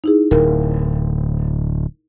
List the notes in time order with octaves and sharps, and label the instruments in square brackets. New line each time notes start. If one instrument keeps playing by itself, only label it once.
[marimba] D#4 E4 G#4
[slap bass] D1 [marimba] A#4